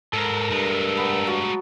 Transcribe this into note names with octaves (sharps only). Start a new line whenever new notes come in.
G#2 A4 A#4
G2 G#3 A3
B3
F#3 F5 A5